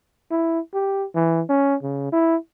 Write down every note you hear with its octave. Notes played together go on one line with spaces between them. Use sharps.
E4
G4
E3
C#4
C#3
E4